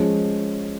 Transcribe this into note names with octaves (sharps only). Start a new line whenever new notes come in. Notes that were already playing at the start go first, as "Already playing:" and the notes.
Already playing: F3 G#3 C#4